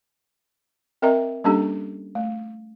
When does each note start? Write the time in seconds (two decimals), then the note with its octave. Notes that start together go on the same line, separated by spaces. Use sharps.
1.02 C4 A#4 D#5 E5 A#5
1.44 G3 A#3 C#4 D4 G4 A4
2.15 A3